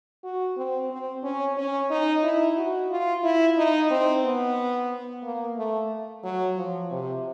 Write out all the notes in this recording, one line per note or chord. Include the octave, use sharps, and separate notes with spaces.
F#4
C4
C4
C#4
C#4
D#4
E4
F#4
F4
E4
D#4
C4
B3
A#3
A3
F#3
F3
C3